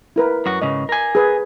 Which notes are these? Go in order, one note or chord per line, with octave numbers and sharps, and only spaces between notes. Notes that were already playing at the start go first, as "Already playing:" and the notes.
E4 A#4 B4
F#2 F#4
G#2 C#3 D#5
A#4 G#5
G#4 B4